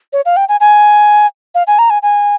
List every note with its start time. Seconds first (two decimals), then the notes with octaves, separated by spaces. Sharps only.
0.13 C#5
0.26 F5
0.37 G5
0.49 G#5
0.60 G#5
1.55 F5
1.67 G#5
1.79 A#5
1.90 G#5
2.03 G#5